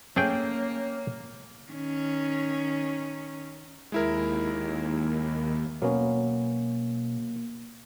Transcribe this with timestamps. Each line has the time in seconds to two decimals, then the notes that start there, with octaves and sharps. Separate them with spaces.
0.16 A3 A#3 C#4 G#4 C#5 G5
1.71 D#3 C#4
3.92 D#2 G#3 E4 A#4
5.82 B2 F#3 A#3 B3 C#4